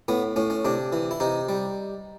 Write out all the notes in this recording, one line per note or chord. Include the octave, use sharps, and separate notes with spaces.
A2 B3
A2 C#4
C#4
C3 D4
E3
E4
C3 D#4
G3